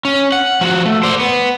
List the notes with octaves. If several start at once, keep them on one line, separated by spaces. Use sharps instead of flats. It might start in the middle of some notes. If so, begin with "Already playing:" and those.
C#4
F#5
F3 F#4
A3
C5 D5
B3